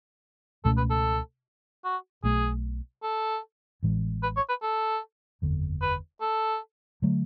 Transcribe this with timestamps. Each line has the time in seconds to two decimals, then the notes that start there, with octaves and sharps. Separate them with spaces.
0.65 C#2 B2 A3 C#4 A4
0.77 B4
0.90 A4
1.85 F#4
2.23 B1 B2 A3 G#4
3.03 A4
3.83 A1 A2 E3 G#3
4.23 B4
4.37 C#5
4.49 B4
4.63 A4
5.42 F#1 E2 D3
5.82 B4
6.21 A4
7.02 D3 F#3 A3